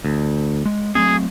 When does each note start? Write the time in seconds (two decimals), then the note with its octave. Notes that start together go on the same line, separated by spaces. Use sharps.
0.05 D2
0.65 G#3
0.95 F#3 A3 C4 G#4